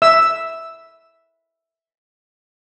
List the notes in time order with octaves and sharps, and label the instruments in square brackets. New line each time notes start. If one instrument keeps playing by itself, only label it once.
[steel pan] E5 E6